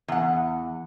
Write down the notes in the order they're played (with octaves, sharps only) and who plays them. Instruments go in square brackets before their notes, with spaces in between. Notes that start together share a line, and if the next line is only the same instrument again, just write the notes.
[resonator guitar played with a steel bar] E2 F#5